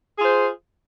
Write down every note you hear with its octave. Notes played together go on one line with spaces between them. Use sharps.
F4 G#4 C5